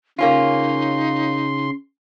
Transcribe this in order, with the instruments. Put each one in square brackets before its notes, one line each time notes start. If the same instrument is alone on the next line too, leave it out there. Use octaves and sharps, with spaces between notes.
[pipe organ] C#3 C6 [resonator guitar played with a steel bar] A#3 C#4 F4 [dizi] D#4